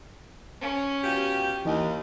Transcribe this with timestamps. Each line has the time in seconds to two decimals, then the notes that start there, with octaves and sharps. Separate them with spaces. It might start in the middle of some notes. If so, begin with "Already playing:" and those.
0.61 C#4
1.03 B2 F3 G4
1.65 D#2 E3 D#4 D#5